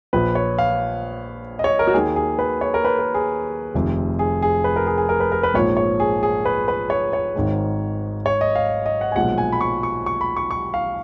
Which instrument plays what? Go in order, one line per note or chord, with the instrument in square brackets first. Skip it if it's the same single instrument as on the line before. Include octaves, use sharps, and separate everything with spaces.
[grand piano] A#1 A#2 F3 B4
C#5
F5
D#5
C#5
A#4
F#4
D#2 D#3 A#3 G#4
G#4
B4
C#5
A#4
B4
A#4
G#4
F1 F2 D#3
G#4
G#4
B4
A#4
G#4
G#4
A#4
B4
A#4
B4
A#1 G#2 F3 A#3 C#5
C#5
G#4
G#4
B4
B4
C#5
C#5
G#1 G#2 D#3 G#3
C#5
D#5
F5
D#5
F#5
G#5
B1 A#2 F3 G#3 F#5
G#5
B5
C#6
C#6
C#6
B5
C#6
C#6
F5